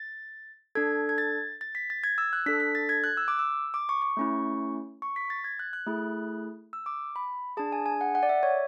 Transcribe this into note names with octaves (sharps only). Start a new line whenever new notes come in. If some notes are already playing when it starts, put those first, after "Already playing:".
Already playing: A6
D4 A4 G#6
G#6
A6
A6
B6
A6
G#6
E6
F#6
D4 A4 B6
B6
A6
G#6
F#6
E6
D6
E6
D6
C#6
C#6
A3 C#4 E4
C#6
B6
A6
G#6
F#6
F#6
A3 E4 G#4
E6
D6
B5
D4 G#4 A5
G#5
G#5
F#5
F#5
D5
E5
C#5